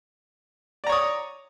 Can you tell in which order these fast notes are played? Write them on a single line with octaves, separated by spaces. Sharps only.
D5 A#5 C#5 D#6